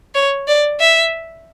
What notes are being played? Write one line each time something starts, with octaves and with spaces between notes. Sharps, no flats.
C#5
D5
E5